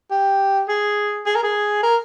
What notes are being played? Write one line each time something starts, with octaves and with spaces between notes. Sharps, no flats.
G4
G#4
G#4
A#4
G#4
A#4